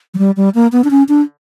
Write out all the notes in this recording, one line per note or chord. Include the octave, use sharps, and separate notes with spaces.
F#3
G3
G3
A#3
B3
D4
C#4
D4